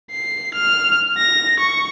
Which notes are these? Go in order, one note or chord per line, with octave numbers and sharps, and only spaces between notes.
C7
F6
A#6
C#6